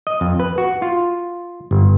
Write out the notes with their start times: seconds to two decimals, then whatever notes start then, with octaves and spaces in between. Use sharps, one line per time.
0.07 D#5
0.21 F2
0.40 B4
0.58 F#4
0.82 F4
1.71 G1